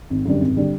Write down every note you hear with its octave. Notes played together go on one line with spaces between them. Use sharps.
G#1
F#2 D3 G3
G#1
D3 G3